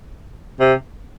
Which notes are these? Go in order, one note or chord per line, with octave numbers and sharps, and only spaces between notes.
C3